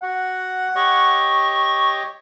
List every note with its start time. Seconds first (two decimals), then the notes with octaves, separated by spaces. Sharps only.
0.02 F#4 F#5
0.75 G4 C#5 D#5 C#6